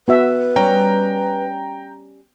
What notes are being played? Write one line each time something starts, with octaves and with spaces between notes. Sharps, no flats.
B3 F#4 B4 E5
G3 C#4 G5 A#5